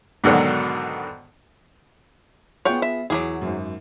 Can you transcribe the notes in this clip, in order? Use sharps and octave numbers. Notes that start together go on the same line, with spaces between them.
G#2 B2 D3 D#3 F#3
B3 F4 G#4 C#5 F#5 G5
E5
E2 E3 F#3 A#3 G#4 D6
G#1 F#2